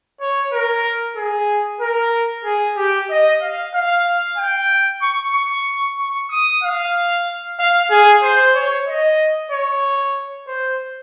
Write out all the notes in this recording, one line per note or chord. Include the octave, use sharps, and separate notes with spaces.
C#5
A#4
G#4
A#4
G#4
G4
D#5
F5
F5
G5
C#6
C#6
C#6
D#6
F5
F5
G#4
C5
C#5
D#5
C#5
C5